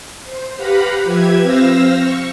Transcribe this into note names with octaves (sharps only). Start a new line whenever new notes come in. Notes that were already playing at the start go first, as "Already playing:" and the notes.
C5
G4 B4 F5 F#5 A#5 B5
F3 G4 B4 E5 G#6
C4 C5 F5 E6 A#6
C#6